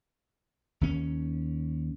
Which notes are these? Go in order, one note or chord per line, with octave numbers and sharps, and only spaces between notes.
D#2 C#4